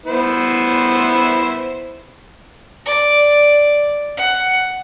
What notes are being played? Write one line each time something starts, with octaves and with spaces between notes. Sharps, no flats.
B3 E4 C5
D5
F#5